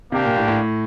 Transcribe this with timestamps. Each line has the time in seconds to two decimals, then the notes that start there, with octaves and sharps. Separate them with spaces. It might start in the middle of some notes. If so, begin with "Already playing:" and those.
0.12 C3 A#3 D4 G4
0.25 A#2
0.37 A2
0.48 A2